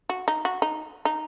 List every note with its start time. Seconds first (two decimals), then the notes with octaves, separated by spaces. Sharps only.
0.10 F#4
0.28 D#4
0.45 F#4
0.62 D#4
1.05 D#4